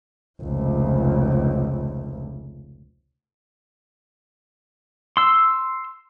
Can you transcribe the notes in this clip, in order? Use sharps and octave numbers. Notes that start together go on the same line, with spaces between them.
F1 C#2
C6 E6